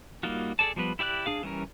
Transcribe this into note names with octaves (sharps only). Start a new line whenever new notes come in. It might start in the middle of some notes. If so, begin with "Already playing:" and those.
G3 A#3 D#4 F4 F#4
G#4 A4 D5 A5
F3 G3 B3 B4
E4 G4 D5 E5 F#6
D4 G#4 F5
E3 G3 C#4 A#4